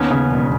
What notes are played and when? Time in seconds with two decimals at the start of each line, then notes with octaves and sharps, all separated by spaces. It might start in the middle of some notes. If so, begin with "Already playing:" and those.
Already playing: D#2 B3 C#4
0.11 C#3
0.31 E1